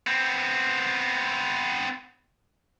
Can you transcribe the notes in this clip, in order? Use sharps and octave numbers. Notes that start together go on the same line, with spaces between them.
B3 C4